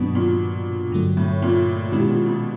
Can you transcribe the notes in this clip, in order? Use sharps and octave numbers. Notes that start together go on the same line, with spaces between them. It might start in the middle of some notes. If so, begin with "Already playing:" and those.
Already playing: G2 B2 D#3 F#3 B3 D4
A#2
G2 D3 F#3 A3
A2
A#2
B2 D#3 G#3 C#4 E4 G4
A#2
B2